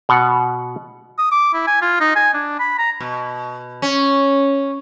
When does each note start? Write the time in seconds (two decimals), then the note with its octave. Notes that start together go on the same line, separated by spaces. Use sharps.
0.09 B2 F#5
1.18 D#6
1.31 D6
1.54 E4
1.67 G#5
1.81 F4
2.00 D#4
2.16 G#5
2.34 D4
2.60 B5
2.78 A#5
3.00 B2
3.82 C#4